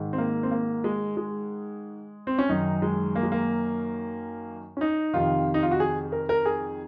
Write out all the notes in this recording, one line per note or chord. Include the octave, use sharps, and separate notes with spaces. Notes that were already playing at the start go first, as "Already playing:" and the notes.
Already playing: G#2 D#3
C4
A#3
C4
A#3
G#3
G#3
C4
C#4
F#2 D#3 D#4
G#3
A#3
G#3
A#3
C#4
D#4
F2 C3 D#3 F4
D#4
F4
F#4
G#4
A#4
A#4
G#4